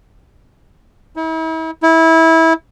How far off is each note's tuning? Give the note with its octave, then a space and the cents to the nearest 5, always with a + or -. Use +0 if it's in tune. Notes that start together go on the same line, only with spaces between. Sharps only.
E4 -40
E4 -20